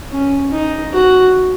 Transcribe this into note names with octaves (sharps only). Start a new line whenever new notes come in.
C#4
D#4
F#4